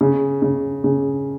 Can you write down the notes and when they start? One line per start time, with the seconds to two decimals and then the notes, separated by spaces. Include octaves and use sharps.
0.01 C#3
0.42 C#3
0.84 C#3